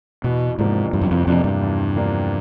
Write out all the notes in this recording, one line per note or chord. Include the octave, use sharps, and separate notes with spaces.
E2 B2
G#2 C3 F3 A#3 D4
E2 G2
F#2
F2
F2 C3 F3 A#3 D4
G2
E2
C3 F3 A#3 D4